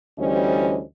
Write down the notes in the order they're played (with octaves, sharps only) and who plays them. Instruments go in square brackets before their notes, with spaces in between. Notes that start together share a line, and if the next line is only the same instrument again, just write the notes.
[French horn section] D2 E3 G3 C#4 C5 D#5